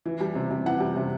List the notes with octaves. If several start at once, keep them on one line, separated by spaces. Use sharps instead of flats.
E3
G3
C3
C3
E3 F#5
G3
C3